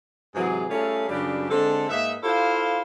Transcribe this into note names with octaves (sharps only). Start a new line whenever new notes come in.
G#2 C3 E3 F#3 G#4
G3 A3 C#4 F4 G#4 A4
F#2 C#3 G3 D4 G4 B4
D3 G#3 C4 A4
G#2 A#3 D#4 B4 E5
E4 F4 G4 A4 C5 F5